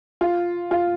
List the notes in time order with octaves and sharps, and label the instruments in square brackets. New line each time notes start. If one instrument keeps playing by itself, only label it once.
[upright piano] F4
F4